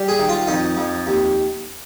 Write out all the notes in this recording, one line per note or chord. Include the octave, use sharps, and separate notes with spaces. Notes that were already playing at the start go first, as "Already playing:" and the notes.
Already playing: G3
G#4
D#3
F4
F2 D#4
F2
D#2